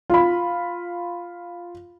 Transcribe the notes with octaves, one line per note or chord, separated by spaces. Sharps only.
F4 B5